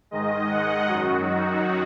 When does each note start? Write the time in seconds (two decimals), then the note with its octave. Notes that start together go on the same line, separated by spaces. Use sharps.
0.11 G#2 D#3 G#3 D#5
0.50 F#5
0.88 F#2 D#3 F#3 F#4
1.28 D#4